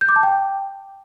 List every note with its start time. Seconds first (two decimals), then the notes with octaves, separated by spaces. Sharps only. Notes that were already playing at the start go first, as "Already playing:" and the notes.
0.01 G6
0.09 D6
0.16 A5
0.23 G5